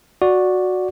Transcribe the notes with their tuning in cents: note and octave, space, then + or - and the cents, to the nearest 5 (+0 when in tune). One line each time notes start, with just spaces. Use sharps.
F#4 -10 D5 +0